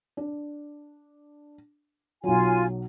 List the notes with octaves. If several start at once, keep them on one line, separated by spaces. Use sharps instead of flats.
D4
B1 F#3 F4 G#5